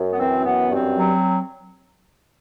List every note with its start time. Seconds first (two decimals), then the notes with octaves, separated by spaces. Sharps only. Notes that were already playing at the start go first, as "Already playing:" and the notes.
Already playing: F#2
0.12 B3
0.19 E3 C4
0.45 F#2 B3
0.71 G2 C4
0.98 F#3